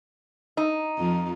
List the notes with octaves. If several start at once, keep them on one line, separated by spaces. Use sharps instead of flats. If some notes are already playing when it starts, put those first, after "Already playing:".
D#4
F2 F3